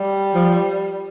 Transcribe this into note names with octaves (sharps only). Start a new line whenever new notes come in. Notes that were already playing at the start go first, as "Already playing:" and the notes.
Already playing: G3
F3